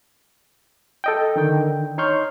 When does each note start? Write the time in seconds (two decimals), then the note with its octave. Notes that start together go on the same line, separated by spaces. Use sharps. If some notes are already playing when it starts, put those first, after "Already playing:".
1.04 A4 D#5 G5
1.36 D3 D#3 G5
1.98 D#4 C#5 C6 C#6 F6 G6